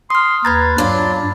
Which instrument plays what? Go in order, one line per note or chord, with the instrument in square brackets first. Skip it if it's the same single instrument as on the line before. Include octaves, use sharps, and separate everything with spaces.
[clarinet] C6 [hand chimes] D#6 F6
[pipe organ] D#2 B4 [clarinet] A#5 [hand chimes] B5 G#6 A6
[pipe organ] G2 [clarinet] F#3 [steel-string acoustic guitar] D4 F4